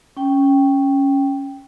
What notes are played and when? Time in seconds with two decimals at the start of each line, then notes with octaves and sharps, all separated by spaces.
0.17 C#4 G5